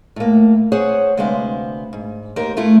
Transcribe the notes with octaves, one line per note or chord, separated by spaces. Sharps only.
A2 A#3
G#4 C5 C#5 F#5
D2 C3 G#3 B3 C5 F5
G#2
D#2 G4 A#4 C5
A3 E4 F4